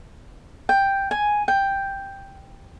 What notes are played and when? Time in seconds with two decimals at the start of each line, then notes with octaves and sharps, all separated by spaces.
0.69 G5
1.11 G#5
1.48 G5